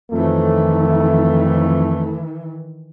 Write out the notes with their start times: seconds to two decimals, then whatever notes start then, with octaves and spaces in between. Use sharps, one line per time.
0.12 F2 D#3 E3 A3